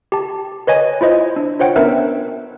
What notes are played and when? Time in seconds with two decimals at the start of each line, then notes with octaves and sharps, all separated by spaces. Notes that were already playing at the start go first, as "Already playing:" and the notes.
0.12 G4 A5
0.67 B4 C#5 D#5 G#5
1.01 E4 F4 C5 D#5
1.36 D4
1.59 F4 C5 C#5 F#5 G5
1.76 B3 C#4 D4 A#4 B4 E5